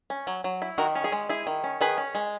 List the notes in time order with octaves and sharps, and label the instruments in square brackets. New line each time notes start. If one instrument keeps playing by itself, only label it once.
[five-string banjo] C#4
F#3
F#3
E4
D#3 F#4 A#4
C#4
G#4
G#3
E4 G#4
D#3
C#4
D#3 G#4 B4
C#4
G#3